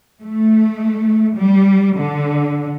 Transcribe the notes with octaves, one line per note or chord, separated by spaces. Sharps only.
A3
G3
D3